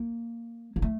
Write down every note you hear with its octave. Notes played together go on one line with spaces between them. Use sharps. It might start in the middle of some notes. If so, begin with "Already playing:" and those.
Already playing: A#3
A#3
A3